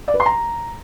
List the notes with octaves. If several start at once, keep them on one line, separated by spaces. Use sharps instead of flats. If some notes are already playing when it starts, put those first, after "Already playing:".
D5
B4
C6
A#5